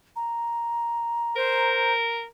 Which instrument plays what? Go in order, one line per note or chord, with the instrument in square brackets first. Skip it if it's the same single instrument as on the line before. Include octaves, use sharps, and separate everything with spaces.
[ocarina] A#5
[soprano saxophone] A#4 [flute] C5